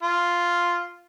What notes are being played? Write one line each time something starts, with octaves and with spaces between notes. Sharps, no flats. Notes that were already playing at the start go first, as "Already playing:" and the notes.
F4